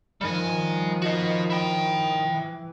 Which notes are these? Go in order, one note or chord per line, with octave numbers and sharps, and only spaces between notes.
D#3 F3 G3 G#5
F#4 D#5
E4 G5
E3